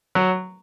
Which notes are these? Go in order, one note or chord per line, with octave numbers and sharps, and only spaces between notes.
F#3